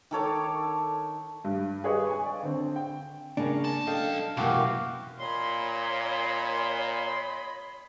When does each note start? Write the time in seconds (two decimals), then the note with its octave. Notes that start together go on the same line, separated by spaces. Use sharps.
0.11 D#3 A4 C#5 D6
1.44 G2
1.84 G4 G#4 B4 C#5 D#5
2.07 G#5 C#6
2.26 D5 F5
2.43 D3 C4
2.76 G5
3.37 C#3 A#3 C#4 D4
3.65 B1 A5
3.87 A4 D#5 F5 G5
4.37 F#2 B2 E3 A#3 F#4 G4 F5
5.19 A#2 C#5 D#5 B5 C6